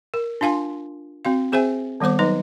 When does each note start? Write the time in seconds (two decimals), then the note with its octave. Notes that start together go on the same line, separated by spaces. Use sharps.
0.14 A#4
0.41 D4 F4 F5 G#5 C6
1.25 C4 F#4 F5
1.52 C4 G#4 C5 E5 G#5
2.00 D#3 G3 B3 C5 D6
2.19 F#3 D#4 B4 D#5